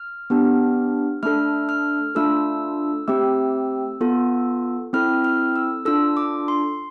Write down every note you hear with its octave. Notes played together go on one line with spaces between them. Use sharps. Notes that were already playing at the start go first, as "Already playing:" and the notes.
Already playing: F6
B3 D4 G4
A3 D4 A4 F6
F6
A3 D4 F4 A4 E6
A3 C4 G4 E6
B3 F4 A4
C4 E4 A4 F6
F6
E6
D4 F4 A4 E6
D6
C6